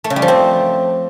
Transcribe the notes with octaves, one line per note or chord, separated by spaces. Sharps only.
A3
C#3
G3
F3
C4